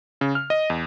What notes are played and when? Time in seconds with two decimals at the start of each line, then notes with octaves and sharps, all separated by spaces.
0.21 C#3
0.35 F6
0.50 D#5
0.70 E2